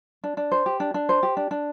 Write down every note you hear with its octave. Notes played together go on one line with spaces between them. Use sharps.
D4
D4
C5
G4
D4
D4
C5
G4
D4
D4